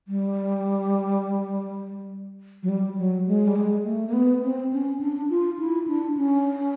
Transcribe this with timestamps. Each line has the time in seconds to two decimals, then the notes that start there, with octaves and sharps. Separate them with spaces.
0.08 G3
2.63 F#3
2.69 G3
2.98 F#3
3.27 G#3
3.47 G3
3.56 G#3
3.84 A3
4.08 A#3
4.13 B3
4.43 C4
4.72 C#4
5.01 D4
5.30 F4
5.59 E4
5.88 D4
6.17 C#4